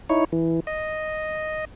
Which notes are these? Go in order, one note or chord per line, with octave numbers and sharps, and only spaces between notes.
D#4 E4 C#5
E3
D#5